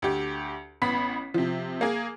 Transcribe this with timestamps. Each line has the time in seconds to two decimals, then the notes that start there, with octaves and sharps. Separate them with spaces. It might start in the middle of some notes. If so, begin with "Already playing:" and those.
0.02 D2 G4
0.82 A1 B3 B5 B6
1.34 C3 F3
1.81 A#3 G#4